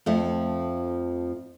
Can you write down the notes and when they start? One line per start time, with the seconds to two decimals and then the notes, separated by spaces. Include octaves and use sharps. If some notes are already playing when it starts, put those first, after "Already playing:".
0.06 F2 F3 A3